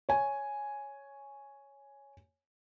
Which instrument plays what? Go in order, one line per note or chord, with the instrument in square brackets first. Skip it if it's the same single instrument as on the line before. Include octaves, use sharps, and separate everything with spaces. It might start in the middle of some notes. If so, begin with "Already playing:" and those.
[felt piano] C#5 G#5